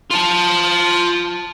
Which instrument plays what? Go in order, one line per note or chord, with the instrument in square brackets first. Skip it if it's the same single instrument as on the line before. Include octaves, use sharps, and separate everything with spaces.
[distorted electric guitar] F4 A5